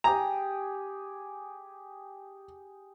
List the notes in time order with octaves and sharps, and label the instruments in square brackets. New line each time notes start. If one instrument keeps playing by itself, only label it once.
[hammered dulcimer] G4 G#4 [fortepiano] A#5